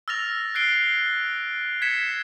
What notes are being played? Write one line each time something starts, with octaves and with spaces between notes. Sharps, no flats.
E6 F6 A6 A#6 F7
F6 F#6 G#6 C7 D7 G7
C7
G#6 B6 C#7 E7